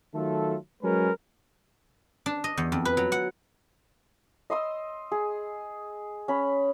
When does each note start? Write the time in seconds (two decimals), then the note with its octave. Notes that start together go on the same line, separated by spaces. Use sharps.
0.14 D#3 F#3 A3 F4 A4
0.83 F#3 G#3 C#4 A#4 B4
2.26 D4
2.44 D#5
2.57 E2
2.72 F2
2.85 B4
2.97 F#3
3.12 F#5
4.50 D#5 C6 D#6 E6
5.12 G#4
6.28 C#4 B5